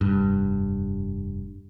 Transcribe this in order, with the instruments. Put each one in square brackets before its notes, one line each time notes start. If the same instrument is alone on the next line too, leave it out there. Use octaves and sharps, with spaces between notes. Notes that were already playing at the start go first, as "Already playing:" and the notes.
[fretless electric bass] F1 G2